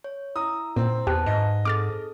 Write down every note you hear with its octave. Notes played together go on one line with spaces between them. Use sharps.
C#5
E4 A#5 D#6 E6
A#2 C4
E2 G4 B4 A5 F#6
G#2 D#5
C4 G#4 A4 D6 F6 A6